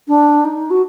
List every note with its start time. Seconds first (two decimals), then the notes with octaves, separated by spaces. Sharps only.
0.08 D4
0.44 D#4
0.70 F#4